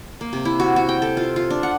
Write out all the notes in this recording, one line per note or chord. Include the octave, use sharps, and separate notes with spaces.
A#3
C3
E4
F#4
F#4
G5
A4
F4
F4
D4
F#5